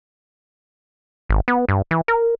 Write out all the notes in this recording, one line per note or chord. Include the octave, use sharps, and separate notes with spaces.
G#1
B3
G2
E3
A#4